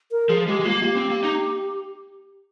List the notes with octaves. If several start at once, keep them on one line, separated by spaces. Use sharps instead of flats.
A#4
F3 G#4
G#3 G4
G#3
A#3 F4
A#3 G4
C4
A#3
D#4